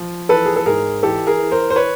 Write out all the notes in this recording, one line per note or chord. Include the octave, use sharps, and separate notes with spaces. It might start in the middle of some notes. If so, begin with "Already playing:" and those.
Already playing: F3
E3 A4 B4
G#4
A4
G#2 G#4 A#4
E3 G4 A4
G#4 A#4
E3
A#4 C5
C5
B4 C#5